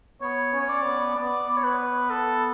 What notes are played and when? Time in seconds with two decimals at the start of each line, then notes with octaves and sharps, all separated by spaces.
0.21 B3 C#5
0.53 C#4
0.61 C#5
0.69 D5
0.85 B3
1.16 B3 D5
1.49 D5
1.56 C#5
1.64 B4
2.10 A4